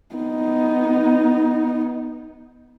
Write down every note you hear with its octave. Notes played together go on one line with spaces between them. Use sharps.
B3 D#4